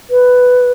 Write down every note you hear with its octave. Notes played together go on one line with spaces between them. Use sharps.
B4